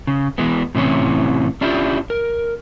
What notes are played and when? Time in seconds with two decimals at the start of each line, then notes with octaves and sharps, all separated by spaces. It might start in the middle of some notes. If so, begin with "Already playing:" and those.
0.07 C#3
0.38 E3 G#3 B3
0.75 A2 C3 E3 C#4
1.61 C#4 D4 E4 F4 G4
2.10 A#4